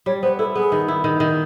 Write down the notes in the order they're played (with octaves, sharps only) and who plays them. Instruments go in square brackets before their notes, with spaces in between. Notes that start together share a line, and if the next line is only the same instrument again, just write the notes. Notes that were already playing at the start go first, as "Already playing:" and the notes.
[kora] G3 [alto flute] C#5
[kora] B3 [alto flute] C5
[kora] E4 [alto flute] A4
[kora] B3 [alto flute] G#4
[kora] D#3
E4
D#3
D#3